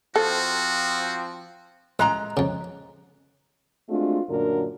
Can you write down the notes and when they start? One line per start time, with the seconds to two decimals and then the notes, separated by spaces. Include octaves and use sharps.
0.16 F3 C4 F#4 A4
1.99 A1 G#3 F4 A#5
2.37 F2 C#3
3.89 G#3 A3 C4 D4 F4 F#4
4.29 F#2 A#2 D3 D4 F#4 A#4